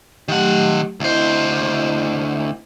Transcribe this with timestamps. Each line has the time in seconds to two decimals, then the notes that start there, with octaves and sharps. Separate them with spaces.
0.28 D#3 F#3 A3 G4 F#5
1.00 D2 C4 E4 C5 D#5